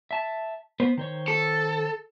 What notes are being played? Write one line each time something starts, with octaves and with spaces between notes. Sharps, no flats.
E5 A5
B3 B4 C5
D#3 C5 C#5
A4